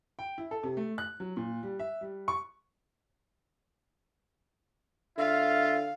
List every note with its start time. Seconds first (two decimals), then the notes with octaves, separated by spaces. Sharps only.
0.19 G5
0.38 E4
0.51 A4
0.63 C3
0.77 A3
0.98 F#6
1.20 F#3
1.37 A#2
1.63 G3
1.79 E5
2.01 G3
2.28 C#6
5.18 D3 F4 E5 F5